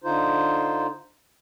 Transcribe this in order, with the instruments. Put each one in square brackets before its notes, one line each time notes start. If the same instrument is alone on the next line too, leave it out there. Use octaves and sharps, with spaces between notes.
[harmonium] D3 D#4 F4 C5